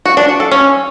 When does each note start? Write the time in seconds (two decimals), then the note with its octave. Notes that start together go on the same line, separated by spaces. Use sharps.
0.05 F#4
0.17 D4
0.28 F#4
0.40 A4
0.51 C#4